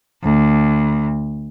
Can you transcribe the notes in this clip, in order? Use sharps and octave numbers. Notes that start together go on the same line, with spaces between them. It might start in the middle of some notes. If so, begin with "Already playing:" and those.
D2